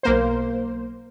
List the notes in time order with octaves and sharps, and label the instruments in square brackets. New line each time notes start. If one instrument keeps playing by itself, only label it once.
[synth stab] B1 A#3 C5